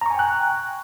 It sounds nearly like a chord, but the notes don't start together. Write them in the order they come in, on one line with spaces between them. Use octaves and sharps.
A#5 C#6 G#5 G5 F#6